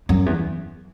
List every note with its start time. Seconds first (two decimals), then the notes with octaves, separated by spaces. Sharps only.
0.09 F#2
0.26 E2